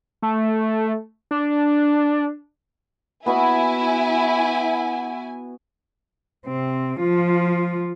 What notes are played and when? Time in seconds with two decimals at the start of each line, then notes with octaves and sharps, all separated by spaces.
0.22 A3
1.31 D4
3.26 B3 E4 F#4 E5 G#5
6.46 C3 C4
7.00 F3 F4